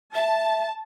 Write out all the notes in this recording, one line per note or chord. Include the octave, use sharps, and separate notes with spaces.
E5 A5